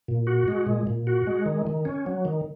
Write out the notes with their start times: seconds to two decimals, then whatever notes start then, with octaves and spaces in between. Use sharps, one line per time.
0.08 A#2
0.27 F#4
0.48 G#3
0.67 A#2
0.87 A#2
1.07 F#4
1.27 G#3
1.46 D#3
1.67 D#3
1.85 C#4
2.06 F#3
2.25 D#3